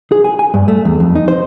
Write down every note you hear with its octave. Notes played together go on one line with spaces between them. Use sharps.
G#4
G#5
G#5
G2
A3
E2
F2
D#4
C5